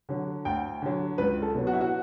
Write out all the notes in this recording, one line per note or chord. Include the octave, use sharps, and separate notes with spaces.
D3 F#3
D2 G5
D3 F#3
C#2 B4
A4
B2 F#3
F#4
E4
F#4